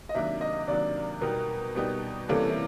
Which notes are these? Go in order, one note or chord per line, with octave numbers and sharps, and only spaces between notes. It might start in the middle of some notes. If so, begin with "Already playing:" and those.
D#5
C3 D#3 F#3 A#3 D4 E5
D#5
C3 D#3 F#3 A#3 D4 D5
B2 G3 B3 D#4 G4 A#4
B2 G3 B3 D#4 G4
C3 E3 G3 A#3 C#4 A4
E4